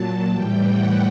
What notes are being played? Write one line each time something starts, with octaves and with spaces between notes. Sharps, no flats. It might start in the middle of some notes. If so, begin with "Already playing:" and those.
Already playing: A#2 F#3 A5
A2 E3 G3 G5
F#5